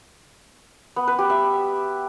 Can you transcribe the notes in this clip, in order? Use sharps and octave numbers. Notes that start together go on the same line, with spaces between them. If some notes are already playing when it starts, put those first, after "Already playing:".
B3
B4
G4
E5